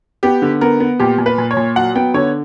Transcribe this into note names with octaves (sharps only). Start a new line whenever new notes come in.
B3 G4
D3
B3 A#4
B3
A#2 G4
A#2
B4
A#2
C#5
A#2
F#3 F#5
B3 G5
D3 C#5